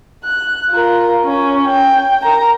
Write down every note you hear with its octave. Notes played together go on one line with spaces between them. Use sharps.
F#6
F4 A#4
C#4
G5
A#4 A#5